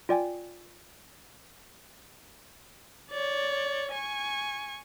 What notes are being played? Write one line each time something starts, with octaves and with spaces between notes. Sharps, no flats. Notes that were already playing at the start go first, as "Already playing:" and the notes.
F4 D5 G5 G#5
C#5 D5
G#5 C#6